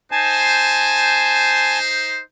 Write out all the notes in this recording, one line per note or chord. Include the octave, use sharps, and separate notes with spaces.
D#4 C5 G#5 A5